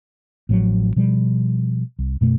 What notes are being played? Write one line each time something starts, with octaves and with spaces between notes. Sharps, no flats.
A1 A2 F3 F#3
B2 F3 G3
C2
F#2 B2 A3